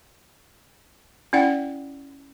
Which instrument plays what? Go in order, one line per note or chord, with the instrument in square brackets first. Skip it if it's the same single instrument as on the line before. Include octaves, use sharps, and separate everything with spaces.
[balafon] C#4 E4 D5 F#5 G5